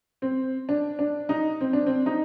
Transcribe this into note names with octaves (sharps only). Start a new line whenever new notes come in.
C4
D4
D4
D#4
C4
D4
C4
D#4